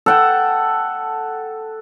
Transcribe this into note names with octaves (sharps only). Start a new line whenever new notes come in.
A4 F#5 G5